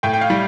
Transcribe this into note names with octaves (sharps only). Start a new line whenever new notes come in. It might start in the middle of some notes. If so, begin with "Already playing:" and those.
A2 G5
G5
F5
G3